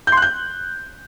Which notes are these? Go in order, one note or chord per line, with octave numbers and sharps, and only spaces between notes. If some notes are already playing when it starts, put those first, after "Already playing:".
G6
C6
F#6
G6